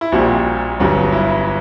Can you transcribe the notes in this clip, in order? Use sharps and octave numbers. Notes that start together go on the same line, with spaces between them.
E4
A#1 A#2 G3 F#4
G1 G2 F#3
E4